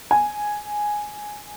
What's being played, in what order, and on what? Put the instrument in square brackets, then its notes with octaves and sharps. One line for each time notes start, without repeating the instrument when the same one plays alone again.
[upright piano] G#5